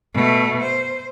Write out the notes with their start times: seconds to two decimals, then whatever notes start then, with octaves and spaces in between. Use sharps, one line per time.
0.14 B2 A3
0.61 C5